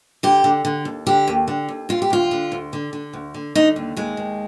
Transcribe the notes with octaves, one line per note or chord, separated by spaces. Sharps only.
D3 G4
D3
D3
D#2
D3 G4
D#2
D3
D#2
D2 F4
G4
D2 F4
D3
D2
D3
D3
D2
D3
D3 D#4
D#2
D#2 G#3
D#2